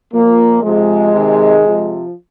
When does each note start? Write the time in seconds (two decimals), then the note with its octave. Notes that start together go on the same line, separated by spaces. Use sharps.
0.14 A#2 F3 A#3
0.63 C3 F3 G#3
1.12 C3 D#3
1.62 C3 F3